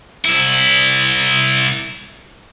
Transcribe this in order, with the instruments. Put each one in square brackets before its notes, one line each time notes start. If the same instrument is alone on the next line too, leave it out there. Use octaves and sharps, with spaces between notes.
[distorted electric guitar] C2 E4